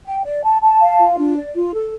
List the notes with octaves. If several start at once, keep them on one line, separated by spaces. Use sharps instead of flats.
G5
D5
A5
A5
F5
F4
D4
D5
F4
A4